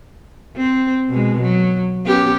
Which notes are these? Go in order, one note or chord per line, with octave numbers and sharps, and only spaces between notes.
C4
B2 G#3
F#3
B3 C#4 G4